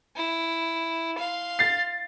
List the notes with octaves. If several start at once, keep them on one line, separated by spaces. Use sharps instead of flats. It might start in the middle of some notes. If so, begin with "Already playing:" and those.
E4
F5 C6
A6 C7